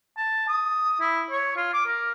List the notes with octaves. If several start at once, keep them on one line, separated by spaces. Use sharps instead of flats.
A5
D#6
E4
C#5
F4
D6
A#4